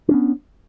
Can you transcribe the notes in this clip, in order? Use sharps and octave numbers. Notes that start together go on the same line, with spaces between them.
B3 C#4 D4